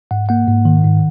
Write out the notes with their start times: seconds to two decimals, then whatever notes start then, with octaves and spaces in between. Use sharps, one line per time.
0.11 G#2 F#5
0.29 A#3 F#5
0.48 G#2
0.65 D#3
0.85 G#2